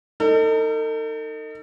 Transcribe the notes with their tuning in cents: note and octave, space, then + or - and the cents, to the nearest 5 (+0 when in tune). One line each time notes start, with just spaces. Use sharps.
D#4 +0 A4 +40